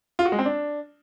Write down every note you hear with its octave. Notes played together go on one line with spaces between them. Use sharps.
F4
F#4
G#3
C4
D4